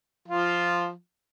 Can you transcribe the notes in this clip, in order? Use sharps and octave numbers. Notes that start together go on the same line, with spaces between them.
F3 F4